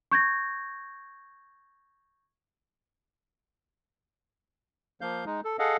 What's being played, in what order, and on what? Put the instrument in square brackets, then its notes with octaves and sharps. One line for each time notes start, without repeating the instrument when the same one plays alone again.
[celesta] C#6 G6 G#6 A#6
[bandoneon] F3 A#3 F5 G6
G#3 D#4
A4
G#4 A4 D#5 F5 F#5